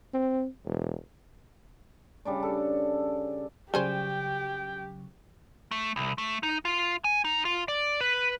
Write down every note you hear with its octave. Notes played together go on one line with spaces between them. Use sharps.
C4
E1
C#3 G3 D4 D5
A4
C#3 F#3 G3 G4 G#4 C5 G5
A3
C2
A3
D#4
F4
G#5
D#4
F4
D5
B4